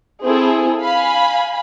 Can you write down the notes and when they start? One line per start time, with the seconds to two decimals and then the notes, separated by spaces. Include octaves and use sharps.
0.23 C4 E4 G#4 A4
0.82 F5 G#5 B5